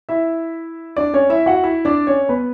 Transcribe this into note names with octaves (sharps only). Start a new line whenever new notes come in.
E4 E5
D4 D5
C#4 C#5
E4 E5
F#4 F#5
E4 E5
D4 D5
C#4 C#5
B3 B4